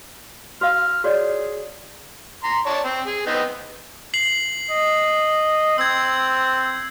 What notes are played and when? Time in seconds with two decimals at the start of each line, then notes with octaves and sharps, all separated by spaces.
0.61 F#4 F5 F6
1.04 F#4 G#4 C#5 D5
2.44 A#5 C6
2.66 C#5 D5 A5
2.85 C4
3.07 G#4
3.27 B3 C4 D#4
4.14 C7 F#7
4.70 D#5
5.78 C4 E6 G#6